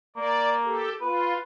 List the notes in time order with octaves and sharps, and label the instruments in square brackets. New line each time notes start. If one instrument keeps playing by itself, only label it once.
[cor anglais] A#3 [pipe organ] D5
[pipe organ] G4 A4
[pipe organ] F4 [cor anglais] B4